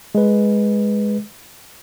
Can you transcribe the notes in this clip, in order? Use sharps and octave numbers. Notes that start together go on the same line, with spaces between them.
G#3 B4